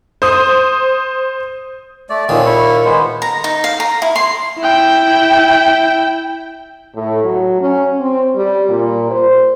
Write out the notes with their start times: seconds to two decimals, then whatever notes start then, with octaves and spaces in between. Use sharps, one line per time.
0.22 C5 D#6
2.10 A3 D5
2.29 D#2 A#2 D#3 A3 C4 G#4
2.45 E4 E5 C#6
2.85 G#3 B3 C5
3.22 A#5
3.44 D#4
3.64 F5
3.80 A#5
4.02 E4
4.16 C6
4.59 E4 G5
6.95 A2
7.24 F#3
7.61 C#4
8.00 C4
8.35 G3
8.69 A#2
9.11 C5